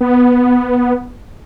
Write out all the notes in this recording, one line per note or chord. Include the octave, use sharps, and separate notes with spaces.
B3